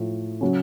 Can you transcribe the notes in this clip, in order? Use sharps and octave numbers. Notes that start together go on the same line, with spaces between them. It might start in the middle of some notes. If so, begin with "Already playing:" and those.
Already playing: A2 F3 A3
C#3 F#3 C#4